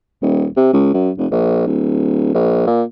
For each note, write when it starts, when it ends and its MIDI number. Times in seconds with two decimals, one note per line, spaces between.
0.22 0.46 27
0.57 0.70 48
0.73 0.91 37
0.94 1.10 42
1.18 1.26 29
1.31 1.64 34
1.67 2.32 26
2.34 2.66 34
2.67 2.83 46